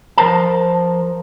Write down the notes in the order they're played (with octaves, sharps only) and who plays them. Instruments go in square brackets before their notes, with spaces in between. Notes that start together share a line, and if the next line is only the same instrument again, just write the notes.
[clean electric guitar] F3 A#4 C5 A5